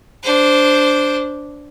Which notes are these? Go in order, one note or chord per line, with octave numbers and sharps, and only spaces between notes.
D4 C5